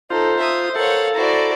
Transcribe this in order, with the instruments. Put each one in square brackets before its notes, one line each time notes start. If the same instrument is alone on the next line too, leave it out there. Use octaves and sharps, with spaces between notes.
[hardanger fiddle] D#4 A4 [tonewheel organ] F4 [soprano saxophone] C5
[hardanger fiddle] E5 D#6
[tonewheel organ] A4 [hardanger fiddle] A#4 F5 [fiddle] C#5 F#5
[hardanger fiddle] E4 F#4 [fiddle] C5 D5 [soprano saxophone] A#5